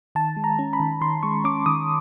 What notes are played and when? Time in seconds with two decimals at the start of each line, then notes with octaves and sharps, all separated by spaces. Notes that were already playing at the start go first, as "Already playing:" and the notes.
0.15 D#3 A5
0.37 G#3
0.44 A#5
0.59 C#4
0.73 B5
0.80 D#3
1.01 D#3 C6
1.23 G#3 C#6
1.44 C#4 D6
1.66 D#3 D#6